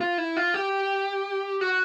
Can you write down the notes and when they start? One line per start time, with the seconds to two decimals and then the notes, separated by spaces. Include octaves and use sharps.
0.01 F4
0.18 E4
0.37 F4
0.54 G4
1.61 F#4